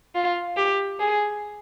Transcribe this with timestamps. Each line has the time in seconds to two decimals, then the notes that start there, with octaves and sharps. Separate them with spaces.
0.15 F4
0.57 G4
1.00 G#4